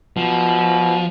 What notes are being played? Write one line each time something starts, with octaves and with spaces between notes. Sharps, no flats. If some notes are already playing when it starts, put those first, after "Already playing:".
B2 F3